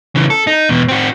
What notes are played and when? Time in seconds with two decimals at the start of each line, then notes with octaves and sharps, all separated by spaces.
0.16 C#3 E3
0.30 A4
0.47 D#4
0.69 E2 B2
0.88 C4 F#4